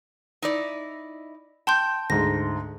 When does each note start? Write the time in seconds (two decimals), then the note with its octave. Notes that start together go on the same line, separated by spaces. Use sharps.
0.42 D#4 E4 D5
1.67 G5 A5 C6 G6
2.10 D2 G#2 A#6